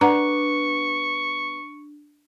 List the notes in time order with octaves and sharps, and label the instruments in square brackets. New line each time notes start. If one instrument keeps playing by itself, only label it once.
[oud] B3 [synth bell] D4 [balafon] F#5 A#5 [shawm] C#6